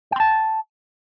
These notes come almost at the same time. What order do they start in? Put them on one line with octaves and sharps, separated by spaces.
G5 C6 A5